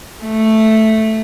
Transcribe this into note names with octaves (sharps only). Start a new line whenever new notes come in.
A3